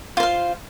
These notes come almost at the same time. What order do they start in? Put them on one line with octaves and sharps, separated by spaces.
F4 C5 F5